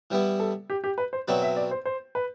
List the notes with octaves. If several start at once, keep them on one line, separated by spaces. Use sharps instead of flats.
E3 G3 B3 E4
A4
G4
G4
B4
C5
B2 F#3 C4 E4 B4 D5
E5
D5
C5
C5
B4